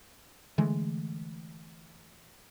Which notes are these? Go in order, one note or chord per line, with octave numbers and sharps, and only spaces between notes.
D3 E3 G#3 A3